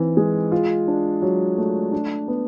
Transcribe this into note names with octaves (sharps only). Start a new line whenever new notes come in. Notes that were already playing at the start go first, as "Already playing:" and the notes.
Already playing: E3 C4 D#4
G#3
F4
D4
F#3
A3
D4
B3